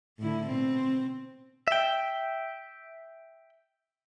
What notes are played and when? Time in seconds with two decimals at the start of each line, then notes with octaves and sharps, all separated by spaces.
0.18 A2 D3 E4
0.47 B2 C4
1.68 E5 G5